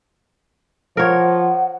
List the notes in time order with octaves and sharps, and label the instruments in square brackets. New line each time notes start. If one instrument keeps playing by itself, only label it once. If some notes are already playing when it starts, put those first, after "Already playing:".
[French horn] F3 [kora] A#4 C#5 [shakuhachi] F#5